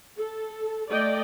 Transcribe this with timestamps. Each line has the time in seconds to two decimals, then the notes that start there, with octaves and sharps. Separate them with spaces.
0.18 A4
0.90 A3 D5 D#5 G5